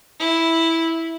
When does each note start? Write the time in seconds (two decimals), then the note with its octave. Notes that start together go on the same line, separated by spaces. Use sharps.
0.20 E4